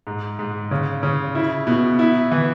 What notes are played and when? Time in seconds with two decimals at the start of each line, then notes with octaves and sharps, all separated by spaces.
0.07 G#2
0.39 G#2
0.71 C#3
1.03 C#3
1.35 E4
1.67 B2
1.99 E4
2.31 E3